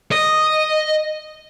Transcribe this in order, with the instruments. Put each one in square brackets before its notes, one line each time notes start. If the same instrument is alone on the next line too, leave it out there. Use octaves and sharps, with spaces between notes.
[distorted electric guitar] D#5